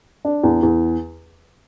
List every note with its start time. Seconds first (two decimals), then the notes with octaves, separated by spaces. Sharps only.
0.25 D4
0.43 E2
0.63 E2